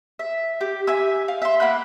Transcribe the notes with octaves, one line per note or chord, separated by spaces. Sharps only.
E5
G4
E5 G#5 E6
F5
E5 C6
A#3 F#5 B5 F#6